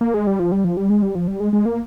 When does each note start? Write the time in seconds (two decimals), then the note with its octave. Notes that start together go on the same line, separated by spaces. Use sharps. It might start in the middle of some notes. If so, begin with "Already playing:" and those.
0.01 A#3
0.14 G#3
0.27 G3
0.39 F3
0.52 G3
0.64 F3
0.77 G3
0.90 G#3
1.02 G3
1.15 F3
1.27 G3
1.40 G#3
1.53 G#3
1.66 A#3